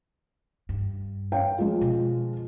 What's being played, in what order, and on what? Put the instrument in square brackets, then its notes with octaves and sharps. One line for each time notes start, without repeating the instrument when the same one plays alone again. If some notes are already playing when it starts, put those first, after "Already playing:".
[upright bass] G2
[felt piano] C#5 F5 G5
F3 G#3 F4
[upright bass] B2 D3